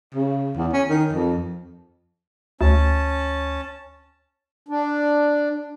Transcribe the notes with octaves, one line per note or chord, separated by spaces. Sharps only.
C#3
E2
C#4
D#3
F2
D2 C#4 A5
D4